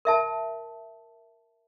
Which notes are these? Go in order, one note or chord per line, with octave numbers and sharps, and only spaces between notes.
A#4 E5 A5